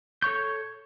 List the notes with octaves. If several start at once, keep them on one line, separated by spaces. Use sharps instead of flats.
A4 C#5 C#6 G6